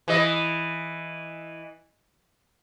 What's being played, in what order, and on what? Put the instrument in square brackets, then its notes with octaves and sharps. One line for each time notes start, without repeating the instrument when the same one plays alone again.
[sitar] E3 D#5